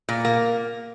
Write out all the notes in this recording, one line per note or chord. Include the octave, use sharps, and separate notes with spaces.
A#2
A#3